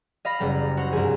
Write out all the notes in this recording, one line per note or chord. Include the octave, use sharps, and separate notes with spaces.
D#5 F5 B5 A#6
F#1 G3 A#5
F#4 C5 A#5
C2 G2 F3 G#4 A#5